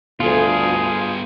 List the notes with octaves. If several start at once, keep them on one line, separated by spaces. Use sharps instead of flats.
D2 G3 B3 F4 G#4